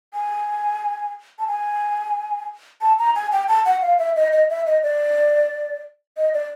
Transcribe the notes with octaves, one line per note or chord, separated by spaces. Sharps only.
G#5
A5
G#5
A5
A#5
G#5
G5
A5
F#5
F5
E5
D#5
D#5
E5
D#5
D5
D#5
D5